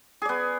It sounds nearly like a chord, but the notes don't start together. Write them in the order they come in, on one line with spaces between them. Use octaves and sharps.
G#4 D5 B3